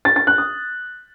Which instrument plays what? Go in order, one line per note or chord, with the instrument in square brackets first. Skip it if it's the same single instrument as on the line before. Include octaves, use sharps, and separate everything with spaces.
[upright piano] A6
A6
F#6
D#6